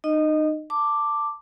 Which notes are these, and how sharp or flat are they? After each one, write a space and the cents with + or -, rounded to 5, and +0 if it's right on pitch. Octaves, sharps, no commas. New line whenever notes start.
D#4 -30 D#5 -5
A5 +20 D6 +0